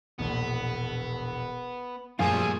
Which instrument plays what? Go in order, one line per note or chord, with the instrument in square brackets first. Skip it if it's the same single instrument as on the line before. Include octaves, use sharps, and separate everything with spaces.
[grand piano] E1 A#1 [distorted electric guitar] B3
[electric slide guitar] F#2 F3 F4 [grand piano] A#2 [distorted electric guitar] G3 A3 [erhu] G#4